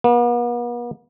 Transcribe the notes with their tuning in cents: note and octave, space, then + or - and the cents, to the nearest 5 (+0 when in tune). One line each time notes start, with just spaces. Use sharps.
B3 -45